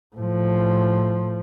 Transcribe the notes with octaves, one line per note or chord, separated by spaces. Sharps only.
A2 F3